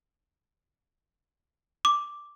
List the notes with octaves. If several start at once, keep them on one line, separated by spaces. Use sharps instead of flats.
D6